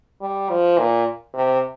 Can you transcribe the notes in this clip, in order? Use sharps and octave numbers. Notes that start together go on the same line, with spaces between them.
G3
F3
A#2
C3